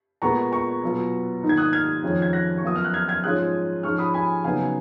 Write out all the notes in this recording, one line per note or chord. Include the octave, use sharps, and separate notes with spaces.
A#2 G#3 B3 A#5 C#6
A#5 C#6
B2 F#3 B3 F4
G#2 D#3 A#3 D#4
G#6
D#6 F#6
F6 G#6
F2 D#3 G#3 C#4 F4
G#6
F#6 A#6
C#6
F#2 F3 B3 F4 D#6
F6
F#6
F6 G#6
F6 G#6
G#2 F3 G#3 C#4 F4 D#6 F#6
G#2 F3 G#3 C#4 C#6 F6
B5 D#6
G#5 B5
C#3 F#3 B3 D#4 F5 G#5